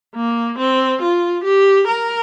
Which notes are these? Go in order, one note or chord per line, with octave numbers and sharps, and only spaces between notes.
A#3
C4
F4
G4
A#4